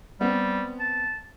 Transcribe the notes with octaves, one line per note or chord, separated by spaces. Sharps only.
G3 B3 C4
A5